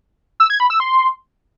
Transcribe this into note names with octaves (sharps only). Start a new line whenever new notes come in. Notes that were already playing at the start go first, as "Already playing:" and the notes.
E6
G#6
B5
E6
C6